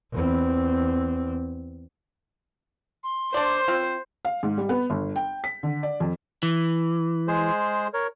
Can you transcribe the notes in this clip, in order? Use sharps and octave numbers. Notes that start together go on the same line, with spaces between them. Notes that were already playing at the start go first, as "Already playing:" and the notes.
E2 C4
C6
D4 C5 D5
C4 F4
F5
G#2
G3
B3
G1
G5
B6
D3
D5
F2
E3
G#3 G#4 C5
A#4 C#5